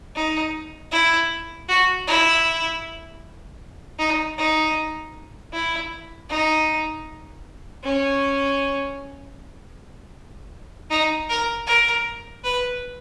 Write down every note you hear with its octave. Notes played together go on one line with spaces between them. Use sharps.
D#4
E4
F#4
E4
D#4
D#4
E4
D#4
C#4
D#4
A#4
A#4
B4